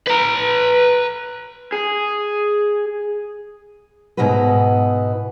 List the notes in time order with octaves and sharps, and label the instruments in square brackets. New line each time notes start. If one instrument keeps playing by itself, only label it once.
[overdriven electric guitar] B4 A#5
G#4
[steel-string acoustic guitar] G#2 B2 D#4 E4 F#4 B4